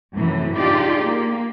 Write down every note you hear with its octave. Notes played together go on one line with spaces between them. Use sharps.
F#2 A2 C3 E3
D4 D#4 F4 G4 G#4 D5
A#3